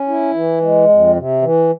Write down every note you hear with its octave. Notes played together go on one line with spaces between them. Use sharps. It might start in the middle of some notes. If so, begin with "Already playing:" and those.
Already playing: C#4
E4
E3
G#3
F2
C3
E3